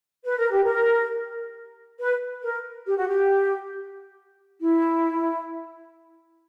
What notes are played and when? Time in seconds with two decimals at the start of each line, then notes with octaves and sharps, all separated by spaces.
0.25 B4
0.38 A#4
0.51 G4
0.65 A#4
1.99 B4
2.42 A#4
2.86 G4
2.96 F#4
3.07 G4
4.60 E4